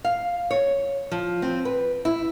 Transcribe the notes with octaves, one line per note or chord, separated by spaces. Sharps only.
F5
C#5
F3
C4
B4
E4